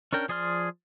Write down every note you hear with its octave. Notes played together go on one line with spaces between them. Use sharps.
C#4 D4 A#4 G5
F3 G#4 D5 C6 F6